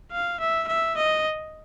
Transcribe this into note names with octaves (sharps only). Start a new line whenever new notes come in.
F5
E5
E5
D#5